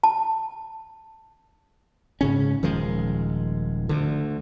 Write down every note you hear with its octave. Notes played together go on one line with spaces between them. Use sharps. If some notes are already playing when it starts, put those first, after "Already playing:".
A5
G#2 C#3 C#4
D#1 D#3 F3 G#3
D2 D3